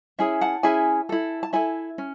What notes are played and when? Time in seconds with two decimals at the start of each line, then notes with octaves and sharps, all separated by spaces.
0.19 C#4 E4 G#4 E5 G#5
0.41 F#5 A5
0.63 C#4 E4 G#4 E5 G#5
1.09 E4 A4
1.43 A5
1.53 E4 A4 E5 G#5
1.98 C#4